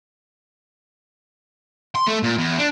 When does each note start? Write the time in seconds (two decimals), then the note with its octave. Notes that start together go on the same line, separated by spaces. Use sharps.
1.96 C6
2.08 A3
2.23 A#2
2.37 E2
2.58 D4